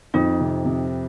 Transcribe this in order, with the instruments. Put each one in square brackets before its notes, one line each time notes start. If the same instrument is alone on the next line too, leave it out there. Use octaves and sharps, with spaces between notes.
[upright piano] F2 [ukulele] D#4
[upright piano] C3
C3